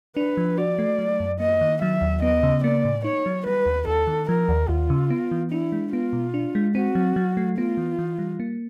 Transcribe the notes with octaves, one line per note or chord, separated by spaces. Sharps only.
D4 B4
F3
F#4 D5
A3
F#3
F#2
A#3 D#5
D#3
F#3 E5
D#2
B3 D#5
C#3
A#3 D5
A2
D#4 C#5
F#3
G3 B4
D#2
D#2 A4
D#3
F3 A#4
D#2
D#2 F4
C#3
B3
E3
D4 E4
G#3
B3 F4
B2
D4
G#3
C4 F#4
F#3
F#3
A3
B3 F4
E3
E3
G3
A#3